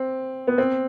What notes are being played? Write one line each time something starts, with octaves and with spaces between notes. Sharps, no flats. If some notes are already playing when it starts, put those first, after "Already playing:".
Already playing: C4
B3
C4